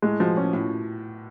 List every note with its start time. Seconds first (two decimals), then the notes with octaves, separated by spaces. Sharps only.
0.02 A2 G#3
0.19 B2 F3
0.36 A#2 C#4
0.53 A2